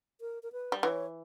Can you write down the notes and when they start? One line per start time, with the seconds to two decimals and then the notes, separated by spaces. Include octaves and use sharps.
0.21 A#4
0.43 A#4
0.52 B4
0.72 G3
0.83 E3 C#5